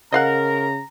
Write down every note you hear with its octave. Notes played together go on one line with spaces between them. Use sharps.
C#3 A#4 D#5 F5 F#5 A#5